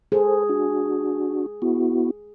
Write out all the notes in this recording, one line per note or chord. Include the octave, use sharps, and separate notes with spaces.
G#4 A4 C5
D4 F#4
B3 E4 F#4